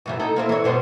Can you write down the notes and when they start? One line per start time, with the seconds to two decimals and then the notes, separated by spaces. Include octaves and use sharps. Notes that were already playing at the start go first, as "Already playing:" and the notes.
0.06 F#2 C3 E3
0.20 D#4 E4 A4
0.36 A#3 C4 E4
0.49 E3 C#5
0.64 G2 B2 C5